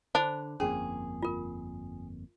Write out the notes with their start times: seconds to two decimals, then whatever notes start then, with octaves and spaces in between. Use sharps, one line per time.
0.15 D3 D4 C5 B5
0.60 G1 F2 A#3 C#4 G#4
1.23 F4 A#4